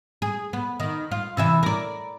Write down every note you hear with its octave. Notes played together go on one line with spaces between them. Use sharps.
G#4
B3
D#3
F4
C3 E3 E5
A#4 D5